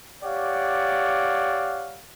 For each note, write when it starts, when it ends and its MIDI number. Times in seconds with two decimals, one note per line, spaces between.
0.23 2.00 67
0.23 2.00 73
0.23 2.00 74
0.23 2.00 77
0.23 2.00 78